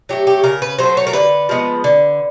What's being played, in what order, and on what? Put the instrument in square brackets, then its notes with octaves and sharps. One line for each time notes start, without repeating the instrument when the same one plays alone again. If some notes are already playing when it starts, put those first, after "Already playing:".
[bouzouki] F#3 A3 G4
G4
C#3 A#4
B4
F#3 A3 C5
C#5
A#4
D3 B4
F3 G#3 B3
D3